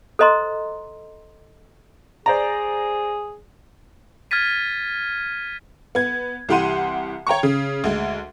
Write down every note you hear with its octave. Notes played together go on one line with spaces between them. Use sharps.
A4 C5 D#5 A#5 C6
G#4 C5 D5 A#5
F6 G#6 A6 B6 D#7
B3 G#6
C2 E3 G4 F#5 C6 D#7
C#5 G5 A#5 C#6
C#3
D2 G#3